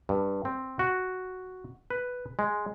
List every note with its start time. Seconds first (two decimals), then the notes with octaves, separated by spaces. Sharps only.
0.09 G2
0.45 C4
0.79 F#4
1.90 B4
2.39 G#3